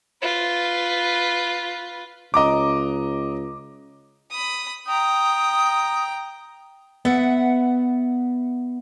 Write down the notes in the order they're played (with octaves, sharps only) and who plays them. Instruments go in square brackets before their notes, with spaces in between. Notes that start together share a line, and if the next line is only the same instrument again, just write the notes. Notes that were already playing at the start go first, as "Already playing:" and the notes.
[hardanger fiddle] F4 B4
[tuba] C#2 [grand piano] D#5 A#5 D6
[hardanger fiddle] B5 D#6
[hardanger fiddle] G5 A#5 [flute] D#6
[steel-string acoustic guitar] B3 E5 F#5